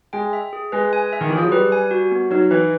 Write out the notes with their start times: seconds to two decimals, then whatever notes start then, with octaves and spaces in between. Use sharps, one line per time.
0.13 G#3 G5
0.33 E5
0.53 G#4
0.72 G#3 B4
0.93 G#5
1.13 E5
1.21 D#3
1.29 E3
1.32 F3 G#4
1.44 F#3
1.52 G3 B4
1.72 G#5
1.91 F#4
2.11 B3
2.30 F#3 D#4
2.51 E3 B4